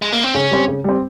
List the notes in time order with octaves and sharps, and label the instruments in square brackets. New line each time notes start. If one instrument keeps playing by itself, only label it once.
[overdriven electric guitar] G#3
A#3
C4
[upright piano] C#3 [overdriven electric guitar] C#4
[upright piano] G3 C4
C#3
G3 C4